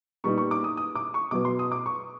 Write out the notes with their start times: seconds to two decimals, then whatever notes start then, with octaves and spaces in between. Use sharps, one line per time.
0.24 A#2 G3 B3 D#4 C#6
0.38 C#6
0.51 D6
0.64 D#6
0.77 D#6
0.95 D6
1.14 C#6
1.31 B2 F#3 B3 D6
1.45 C6
1.59 D#6
1.72 D6
1.86 C#6